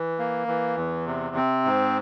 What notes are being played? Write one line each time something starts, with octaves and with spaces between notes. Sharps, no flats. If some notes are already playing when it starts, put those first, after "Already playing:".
Already playing: E3
A#3
E3
E2
C3
C4
G#2